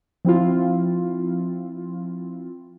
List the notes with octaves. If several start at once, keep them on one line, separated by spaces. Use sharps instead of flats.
F3 C4 E4 F4